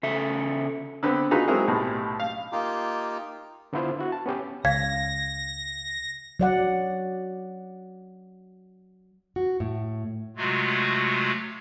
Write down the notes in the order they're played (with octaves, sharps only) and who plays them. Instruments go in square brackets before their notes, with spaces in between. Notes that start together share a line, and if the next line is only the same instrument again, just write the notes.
[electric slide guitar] C#3 A4 E5
[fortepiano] D3 B3 C4
D#4 F4 F#4 G#4 A4 B4
F#3 G#3 C4 E4 G#4 A#4
B1 A2 C3
F5
[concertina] A#3 D#4 F4 G4
[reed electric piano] D3 B3 D4 E4 F4 C5
E4 F#4
A5
B3 C#4 G4
[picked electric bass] C#2 [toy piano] F5 [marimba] G#6 [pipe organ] A#6
[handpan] F#3 D5 F#5
[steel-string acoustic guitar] F#4
A2
[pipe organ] C3 F#3 G#3 A3 F4 F#4